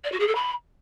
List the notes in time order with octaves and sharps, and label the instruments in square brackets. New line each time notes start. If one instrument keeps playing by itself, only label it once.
[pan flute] D5
F#4
G#4
A4
B5